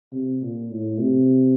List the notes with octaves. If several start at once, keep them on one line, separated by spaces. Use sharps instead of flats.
C3
A#2
A2
C3